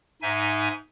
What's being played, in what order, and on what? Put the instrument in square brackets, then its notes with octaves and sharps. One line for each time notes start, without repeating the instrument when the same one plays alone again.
[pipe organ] G#2 D#4 E5 G#5